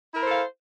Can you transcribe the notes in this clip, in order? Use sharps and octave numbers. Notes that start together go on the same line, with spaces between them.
E4 A4 A#4 C5 F5